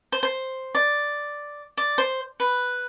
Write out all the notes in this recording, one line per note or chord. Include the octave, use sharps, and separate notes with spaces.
C5
C5
D5
D5
C5
B4